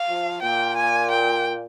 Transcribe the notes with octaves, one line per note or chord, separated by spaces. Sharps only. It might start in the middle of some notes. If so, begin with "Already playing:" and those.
Already playing: F5
F3
A#2 G5
G#5
G5